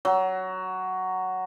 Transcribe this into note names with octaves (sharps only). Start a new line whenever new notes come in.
F#3